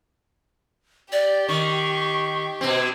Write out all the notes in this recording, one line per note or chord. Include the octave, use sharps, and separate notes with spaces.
G4 D5
D#3 C#6
B2 C4